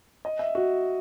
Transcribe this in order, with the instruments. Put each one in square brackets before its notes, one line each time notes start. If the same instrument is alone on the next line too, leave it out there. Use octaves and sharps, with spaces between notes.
[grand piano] D#5
E5
F#4